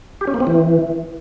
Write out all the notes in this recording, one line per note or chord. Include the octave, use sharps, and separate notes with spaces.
G4
C#4
A#3
C4
E3